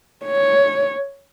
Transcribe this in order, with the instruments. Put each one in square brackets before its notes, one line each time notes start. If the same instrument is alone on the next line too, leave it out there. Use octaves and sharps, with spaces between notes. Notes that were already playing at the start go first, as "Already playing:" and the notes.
[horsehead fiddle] C#5